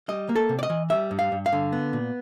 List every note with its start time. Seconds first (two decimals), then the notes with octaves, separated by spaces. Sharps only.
0.08 G3 D#5
0.29 A#3
0.36 A4
0.49 C3
0.59 D5
0.63 D#5
0.70 E3
0.90 G3 E5
1.11 G2
1.19 F5
1.32 G2
1.46 F5
1.52 D3
1.72 B3
1.93 A#2